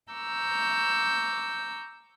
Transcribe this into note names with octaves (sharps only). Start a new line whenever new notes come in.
A#5 C#6 D6 E6 G6